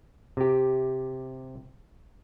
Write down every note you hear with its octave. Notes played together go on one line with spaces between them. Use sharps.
C3 G4